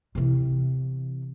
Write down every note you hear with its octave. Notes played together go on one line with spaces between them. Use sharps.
C3 E3